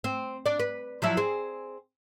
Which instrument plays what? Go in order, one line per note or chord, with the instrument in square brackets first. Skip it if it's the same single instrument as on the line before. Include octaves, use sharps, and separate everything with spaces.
[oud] C4
D4 D5
B4
F3 F#3 E4
C4 G#4